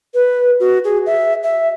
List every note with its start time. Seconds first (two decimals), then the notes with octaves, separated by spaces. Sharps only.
0.14 B4
0.59 F#4
0.84 G#4
1.06 E5
1.43 E5